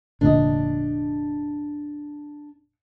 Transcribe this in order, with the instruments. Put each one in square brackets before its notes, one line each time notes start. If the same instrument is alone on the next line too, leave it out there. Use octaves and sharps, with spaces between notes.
[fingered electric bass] F1 A#2 D3 [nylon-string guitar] D4 D#5